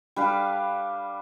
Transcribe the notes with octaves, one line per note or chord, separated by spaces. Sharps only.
G3 D4 B4 F5